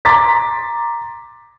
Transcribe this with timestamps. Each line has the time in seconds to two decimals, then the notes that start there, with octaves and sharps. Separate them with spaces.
0.05 A#5 C6 D6 A6 B6